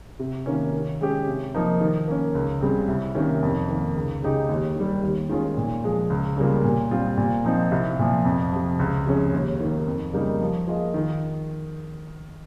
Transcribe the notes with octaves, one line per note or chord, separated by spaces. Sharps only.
C3
D#3 A#3 C#4
D#3
G#3 C#4 G4
C3
F3 A#3 D#4
D#3
A#3 C#4
C#2
C#3 G3 C4
C2
C3 D#3 A#3 C#4
F2
D#3 A#3
C#2
C#3 G#3 D#4 G4
D#2
D#3 G3
D#2
D#3 G#3 C#4 F4
A#2
F3 G#3
C#2
C#3 G3 A#3 F4
A#2
G3 C4 F4
A#2
F3 C4 D#4
C2
A#2 F3
F2
C3 F3
C#2
C3 F3 G#3 C#4
D#2
D#3 A#3
F2
C#3 G3 A#3 D#4
F3
A#3 F4 G#4 D#5
D#3